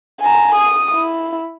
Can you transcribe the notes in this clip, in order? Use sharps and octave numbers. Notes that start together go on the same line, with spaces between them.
G#5 A#5
D#6
E4